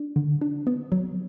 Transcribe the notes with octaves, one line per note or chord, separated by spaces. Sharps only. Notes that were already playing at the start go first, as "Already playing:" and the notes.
Already playing: D4
D3
D4
B3
F#3